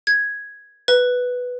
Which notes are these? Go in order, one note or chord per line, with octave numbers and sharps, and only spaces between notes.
G#6
B4